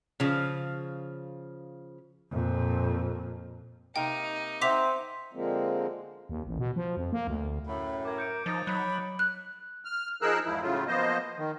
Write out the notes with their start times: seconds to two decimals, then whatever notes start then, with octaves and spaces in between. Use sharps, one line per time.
0.20 C#3 F3
2.31 F2 A#2
3.96 C3 A#3 D#4 A#4 G5
4.61 C4 C5 E5 F#5 D6 B6 F7
5.33 D3 F3 G#3 A#3 C4
6.29 D#2
6.47 A1
6.59 B2
6.76 F3
6.97 F2
7.12 A#3
7.27 D2
7.67 F#2 A2 B5
8.05 A#4 D6 G#6
8.18 G6 C#7 D7
8.46 F3 D#4 A#5 D#6 A6 C#7
8.67 F#3 B5 F#6 F#7
9.19 F#6
9.85 F6
10.22 F3 D#4 G#4 A#4 E6 F#6
10.45 E2 G#2 F3 E4
10.62 A2 C#3 F#3 A3 F4
10.87 F3 A#3 B3 C5 D#5
11.38 D#3